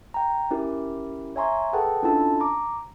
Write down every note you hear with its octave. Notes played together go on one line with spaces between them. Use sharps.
G5 A#5
C#4 E4 G4 A#4
C#5 E5 G#5 A#5 C6 C#6
G#4 A4 B4 F#5 G5 A5
C#4 D4 E4 F4 A4 A5
A#5 D6